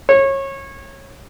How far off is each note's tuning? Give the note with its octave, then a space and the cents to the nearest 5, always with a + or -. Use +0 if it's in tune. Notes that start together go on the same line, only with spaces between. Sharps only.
C#5 -25